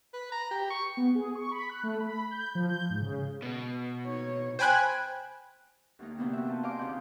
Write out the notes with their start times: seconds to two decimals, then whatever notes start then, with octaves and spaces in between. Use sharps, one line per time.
0.13 B4
0.32 A#5
0.51 G4
0.70 C#6
0.97 B3
1.15 G#4
1.35 C#6
1.51 B5
1.69 F#6
1.83 A3
2.00 B5
2.31 G6
2.55 F3
2.68 G6
2.90 G#2
3.02 C#3
3.42 B2
4.05 D#4 C#5
4.59 C5 G5 G#5 B5 F#6 G#6
5.99 D2 G3 A#3 D#4
6.18 C3 E3 F#3 A#3 B3 D4
6.33 F#4 G4 E5
6.47 C4 F4 B4 A5
6.63 C5 D#5 F5 G#5 A#5 D6
6.79 D#2 C#3 C4 F4 F#5 G6